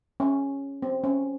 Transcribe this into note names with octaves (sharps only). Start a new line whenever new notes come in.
C#4
C4
C#4